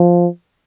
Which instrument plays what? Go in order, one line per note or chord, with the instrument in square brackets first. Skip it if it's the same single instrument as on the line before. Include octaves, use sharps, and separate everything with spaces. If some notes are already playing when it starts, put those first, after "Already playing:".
Already playing: [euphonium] F3